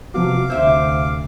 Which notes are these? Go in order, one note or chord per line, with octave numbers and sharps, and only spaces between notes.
C3 F3 B3 F#4 F5 D6
D2 C3 C5 E5 E6